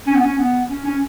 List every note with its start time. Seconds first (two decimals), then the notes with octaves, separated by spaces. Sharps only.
0.07 C#4
0.15 B3
0.23 C#4
0.38 B3
0.70 C#4
0.85 C#4